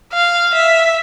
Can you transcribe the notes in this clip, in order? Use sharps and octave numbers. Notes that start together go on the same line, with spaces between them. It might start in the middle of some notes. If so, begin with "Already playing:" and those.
F5
E5